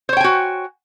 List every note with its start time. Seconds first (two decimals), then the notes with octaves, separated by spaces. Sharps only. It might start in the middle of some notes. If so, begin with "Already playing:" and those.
0.09 C5
0.13 C#5
0.17 G5
0.20 G#5
0.24 F#4